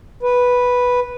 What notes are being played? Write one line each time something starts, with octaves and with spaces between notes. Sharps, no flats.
B4